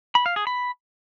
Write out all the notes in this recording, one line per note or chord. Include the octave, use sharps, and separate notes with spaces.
B5
F5
G#4
B5